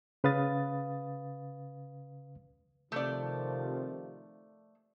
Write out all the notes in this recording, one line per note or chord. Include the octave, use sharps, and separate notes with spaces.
C#3 B4 F5 D#6 A6
C3 D#3 F3 A3 D5